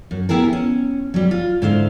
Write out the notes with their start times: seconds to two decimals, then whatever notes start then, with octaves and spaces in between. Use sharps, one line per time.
0.11 F#2
0.29 B3 E4 G4 G#4 A#4
0.53 C#4
1.14 F#3 G3
1.31 F4
1.62 G#2 D3 E4 C5 F5